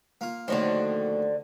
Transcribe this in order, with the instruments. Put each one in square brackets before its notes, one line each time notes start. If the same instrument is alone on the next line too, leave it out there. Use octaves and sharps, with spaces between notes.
[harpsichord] A#3 F4
[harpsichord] A#1 A2 D#3 [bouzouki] D3 F#4 C5